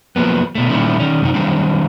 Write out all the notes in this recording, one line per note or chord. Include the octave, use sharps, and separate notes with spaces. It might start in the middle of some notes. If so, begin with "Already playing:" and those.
F3 F#3 A#3 B3
B2 A3
A#2 D#3 G3 A3 C#4 E4
D#3 C#4
F#2 C3 D#4
D#3 F#3 G3 C4 D4